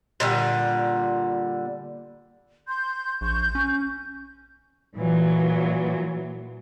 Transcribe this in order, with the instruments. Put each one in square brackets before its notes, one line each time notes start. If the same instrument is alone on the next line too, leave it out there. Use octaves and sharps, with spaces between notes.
[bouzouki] A#2 D3 G3
[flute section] C6 G6
[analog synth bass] A#1 [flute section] C#6 G6
[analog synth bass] C#4
[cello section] A#2 E3 F#3